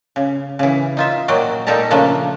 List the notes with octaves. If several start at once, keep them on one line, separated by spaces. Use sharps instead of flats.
C#3
C#3 E3
D#4 F4 E5
A#2 F#3 F#4 D5 D#5 G5
A#2 G3 D#4 G4 A4 A#5
C#3 F3 A3 A#3 D4